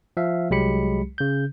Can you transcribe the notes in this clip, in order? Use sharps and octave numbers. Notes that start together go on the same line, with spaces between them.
F3 E5 F5
C2 F#3 G#3 G4 B5 C#7
C#3 G6